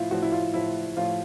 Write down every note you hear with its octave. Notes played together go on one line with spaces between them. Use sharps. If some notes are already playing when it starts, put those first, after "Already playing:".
Already playing: A2 F3 E4 F4
A2 F3 F#4
E4
F4
A2 F3 E4
A2 F3 F4